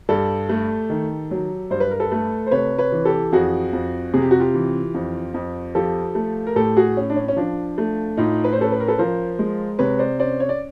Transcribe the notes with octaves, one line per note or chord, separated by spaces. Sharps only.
G2 G4 A4
A3
D#3
F#3
G2 C5
B4
A#4
A4 B4
A3
C5
C3 B4 C#5
B4 C#5
E3
G4 A4
F2 F#4 G#4
F2
C3 G#4
G4
F#4
F4 G4
E3
F2
F2
F3 G4 A4
A3
A#4
A2 G4 A4
F#4 G#4
C#4
D4
C#4
C#4
F3 D4
A3
A2 D#4 F4
B4
C5
C#4 A4 B4
B4
A#4
A4 B4
F3 A#4 C5
G#3
C3 B4 C#5
C5 D5
C#4 C5 D5
C#5
D5